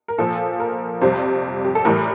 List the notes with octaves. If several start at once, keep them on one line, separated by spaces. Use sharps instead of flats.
A#4
A#2 F3 A4
A#4
F2 C3 G3 C5
G4
A4
A2 E3 G3 A#4